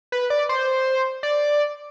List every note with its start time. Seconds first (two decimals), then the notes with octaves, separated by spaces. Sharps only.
0.12 B4
0.30 D5
0.49 C5
1.23 D5